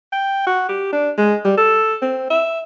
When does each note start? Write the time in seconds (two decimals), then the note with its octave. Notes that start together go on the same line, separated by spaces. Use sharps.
0.13 G5
0.47 F#4
0.69 G4
0.93 D4
1.18 G#3
1.45 G3
1.58 A4
2.02 C4
2.30 E5